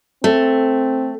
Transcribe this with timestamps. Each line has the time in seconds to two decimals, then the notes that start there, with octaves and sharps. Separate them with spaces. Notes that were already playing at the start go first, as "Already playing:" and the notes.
0.24 A3 C4